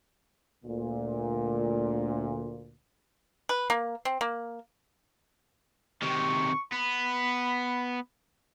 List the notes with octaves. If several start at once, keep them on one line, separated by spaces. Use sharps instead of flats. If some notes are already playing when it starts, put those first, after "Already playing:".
D2 A#2
B4
A#3
C4
A#3
C3 D#3 C#6
B3 B5